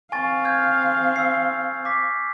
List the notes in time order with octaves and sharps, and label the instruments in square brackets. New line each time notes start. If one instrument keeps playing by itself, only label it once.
[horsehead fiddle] C4 F5 [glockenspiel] G#5 C#6 A6
[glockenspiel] F6 G6 G#6
E6 C7
D6 A#6 B6